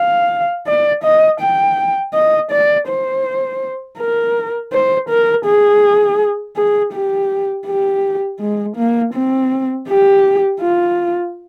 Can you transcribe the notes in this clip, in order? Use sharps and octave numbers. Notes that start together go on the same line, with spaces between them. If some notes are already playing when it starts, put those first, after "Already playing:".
Already playing: F5
D5
D#5
G5
D#5
D5
C5
A#4
C5
A#4
G#4
G#4
G4
G4
G#3
A#3
C4
G4
F4